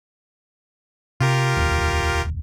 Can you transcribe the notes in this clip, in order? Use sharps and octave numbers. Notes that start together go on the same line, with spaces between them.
C3 F4 G4 A#4
E1 D2